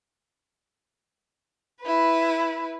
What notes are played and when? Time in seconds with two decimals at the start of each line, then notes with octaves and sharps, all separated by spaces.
1.82 E4 B4